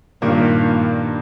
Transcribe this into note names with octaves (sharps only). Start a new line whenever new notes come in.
G2 A#2 D#3 A#3